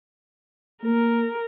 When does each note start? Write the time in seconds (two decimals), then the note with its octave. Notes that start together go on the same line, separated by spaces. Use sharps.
0.84 A#3 A#4